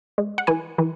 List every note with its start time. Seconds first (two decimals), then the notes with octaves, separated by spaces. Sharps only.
0.18 G#3
0.38 F#5
0.47 E3 G#5
0.78 E3